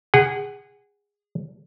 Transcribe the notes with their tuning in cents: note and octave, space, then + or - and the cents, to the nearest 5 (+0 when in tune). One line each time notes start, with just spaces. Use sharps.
G#4 -20 F#5 +20